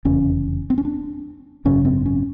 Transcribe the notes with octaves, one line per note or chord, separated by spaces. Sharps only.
F1 E2 C#3 C#4
C4
C#4
D4
G#1 F#2 C#3 C#4
C4
C#4